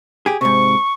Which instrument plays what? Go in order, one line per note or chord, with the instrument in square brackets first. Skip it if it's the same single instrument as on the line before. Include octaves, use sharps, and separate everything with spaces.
[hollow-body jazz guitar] G4 G#4
[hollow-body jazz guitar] G#2 C3 [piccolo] C#6